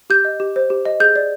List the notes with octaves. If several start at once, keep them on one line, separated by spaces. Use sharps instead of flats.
G4 G6
D#5
G4
C5
G4
D#5
G#4 G6
D5